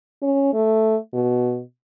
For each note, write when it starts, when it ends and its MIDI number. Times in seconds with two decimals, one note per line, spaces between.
0.22 0.52 61
0.54 0.97 57
1.13 1.61 47